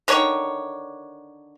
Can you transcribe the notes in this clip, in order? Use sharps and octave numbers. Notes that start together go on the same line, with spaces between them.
D3 D#3 C#5